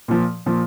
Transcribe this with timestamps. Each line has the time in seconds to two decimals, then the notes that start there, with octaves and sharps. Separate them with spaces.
0.08 A#2 F3
0.46 A#2 F3